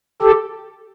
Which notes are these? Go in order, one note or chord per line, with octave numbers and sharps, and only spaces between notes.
G4 A4